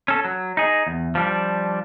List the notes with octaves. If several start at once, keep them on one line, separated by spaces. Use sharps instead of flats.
C#4 A4
F#3
D#4 G#4
E2
F3 G3 D4